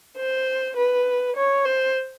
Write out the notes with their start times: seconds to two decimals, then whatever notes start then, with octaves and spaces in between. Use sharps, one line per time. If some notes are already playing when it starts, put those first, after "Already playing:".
0.17 C5
0.76 B4
1.36 C#5
1.66 C5